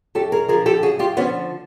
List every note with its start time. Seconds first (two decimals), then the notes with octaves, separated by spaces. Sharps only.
0.15 F#2 G4 A4
0.32 G#4 A#4
0.48 D3 F3 G#4 A#4
0.66 G4 A4
0.82 F#2 F#4 G#4
0.99 F4 G4
1.17 D3 F3 B3 C#4